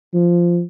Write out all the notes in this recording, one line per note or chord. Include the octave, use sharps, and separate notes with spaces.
F3